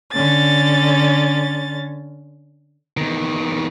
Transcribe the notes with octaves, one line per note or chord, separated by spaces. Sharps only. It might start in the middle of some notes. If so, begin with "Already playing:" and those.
D3 C#4 A6
E2 D#3